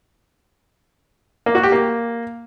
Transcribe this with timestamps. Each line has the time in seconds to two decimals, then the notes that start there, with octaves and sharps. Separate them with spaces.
1.46 A#3
1.55 F#4
1.63 G4
1.72 A#3